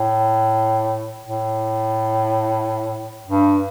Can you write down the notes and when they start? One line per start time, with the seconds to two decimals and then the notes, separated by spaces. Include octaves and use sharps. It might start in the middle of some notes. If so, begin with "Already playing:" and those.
Already playing: A2
1.25 A2
3.27 G2